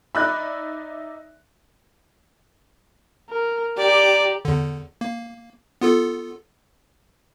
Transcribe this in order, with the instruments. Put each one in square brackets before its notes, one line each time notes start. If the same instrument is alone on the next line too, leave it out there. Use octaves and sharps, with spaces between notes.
[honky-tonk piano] D#4 D5 E5 [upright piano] B5 F#6
[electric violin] A#4
[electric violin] G4 A#5 [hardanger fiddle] D5
[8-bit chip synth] E2 D3
A#3
B3 F4 A4